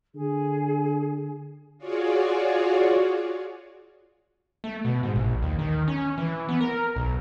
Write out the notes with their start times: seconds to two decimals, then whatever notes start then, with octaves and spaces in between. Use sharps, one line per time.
0.15 D3 G#4
1.78 F4 F#4 G#4 C#5 D5
4.64 A3
4.85 B2
5.03 G#2
5.16 A#1
5.42 D#2
5.59 D#3
5.88 C#4
6.18 E3
6.49 B3
6.61 A#4
6.96 B1